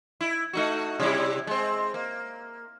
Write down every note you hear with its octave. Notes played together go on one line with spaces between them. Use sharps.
E4
A3 D#4 F#4
C3 G3 E4
G#3 C4
A#3